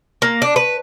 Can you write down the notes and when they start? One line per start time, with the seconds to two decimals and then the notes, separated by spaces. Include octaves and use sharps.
0.22 A#3
0.42 D4
0.56 B4